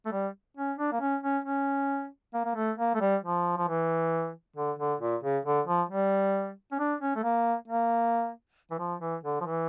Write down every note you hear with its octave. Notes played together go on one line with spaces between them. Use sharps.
A3
G3
C#4
D4
A#3
C#4
C#4
C#4
A#3
A#3
A3
A#3
A3
G3
F3
F3
E3
D3
D3
A#2
C#3
D3
F3
G3
C#4
D4
C#4
A3
A#3
A#3
E3
F3
E3
D3
F3
E3